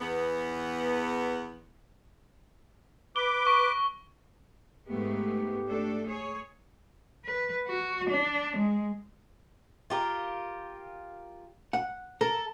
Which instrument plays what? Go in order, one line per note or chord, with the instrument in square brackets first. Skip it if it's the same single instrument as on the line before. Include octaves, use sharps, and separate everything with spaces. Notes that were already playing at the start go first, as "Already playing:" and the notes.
[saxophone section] E2 B3
[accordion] B4 D6 [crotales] G7
[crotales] C#6
[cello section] G#2 A3 B3 [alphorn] G4
[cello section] A3 D4 A4
G#4 C#5
[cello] B4
F#4
D4
G#3
[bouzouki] F4 G4 A#4
[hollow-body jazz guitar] F#5
[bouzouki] A4 [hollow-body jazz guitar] A#4